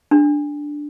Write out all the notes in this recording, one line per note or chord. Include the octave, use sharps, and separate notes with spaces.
D4